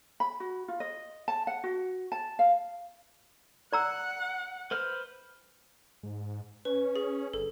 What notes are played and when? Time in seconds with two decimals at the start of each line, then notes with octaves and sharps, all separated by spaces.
0.20 B5
0.40 F#4
0.68 F4
0.80 D#5
1.28 A5
1.47 F#5
1.64 F#4
2.12 A5
2.39 F5
3.73 D5 F#5 A#5 E6
4.71 B4 C5 F6
6.03 G#2
6.65 C#4 B4
6.96 G#4
7.34 G1 A4